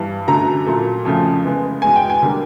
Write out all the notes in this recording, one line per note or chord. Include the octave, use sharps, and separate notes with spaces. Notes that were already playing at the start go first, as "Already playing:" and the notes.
Already playing: G2 E3 G3
F#2 D3 F#3 A3 A#5
A#2 F#3 A3
F2 C#3 F3 A3
C#3 E3 G#3 B3
E2 B2 G#3 B3 G#5
G5
G#5
D3 G3 A#3